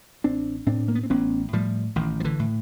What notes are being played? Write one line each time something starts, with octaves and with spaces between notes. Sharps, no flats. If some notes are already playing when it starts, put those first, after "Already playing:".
A1 C4 D4
A2 C4 D4
A#3
B3
C4
A1 B3 C#4
A2 F3 G3
A1 D#3
F3
D3 E3
A2